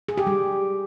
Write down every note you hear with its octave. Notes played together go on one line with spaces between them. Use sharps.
G#4
G4
G3